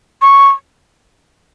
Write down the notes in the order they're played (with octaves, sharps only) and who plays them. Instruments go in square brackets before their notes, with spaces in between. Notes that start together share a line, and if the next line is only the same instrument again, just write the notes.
[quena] C#6